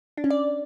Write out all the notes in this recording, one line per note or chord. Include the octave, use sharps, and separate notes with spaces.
D4
C#4
D5